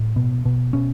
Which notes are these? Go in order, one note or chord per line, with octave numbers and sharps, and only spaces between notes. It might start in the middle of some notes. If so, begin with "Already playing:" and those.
Already playing: A2
B2
B2
B2 C#4